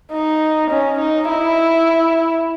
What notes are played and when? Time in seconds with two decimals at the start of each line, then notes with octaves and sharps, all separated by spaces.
0.12 D#4
0.70 C#4
0.99 D#4
1.29 E4